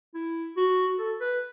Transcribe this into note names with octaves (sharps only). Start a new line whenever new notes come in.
E4
F#4
A4
B4